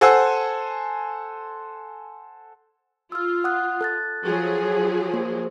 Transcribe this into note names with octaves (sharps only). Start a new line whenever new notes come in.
A4 C5 F#5 G#5 C6 E6
F4 E6 F6
F#5 D#6 F#6
A4 F#6 A6
F3 F#3 G#4
A#3 C5